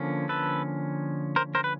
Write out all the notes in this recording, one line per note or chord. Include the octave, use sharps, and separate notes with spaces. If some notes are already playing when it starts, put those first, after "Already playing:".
Already playing: D3 F3 A#3 C#4
A4 B4
A#4 C5
A#4 C5
B4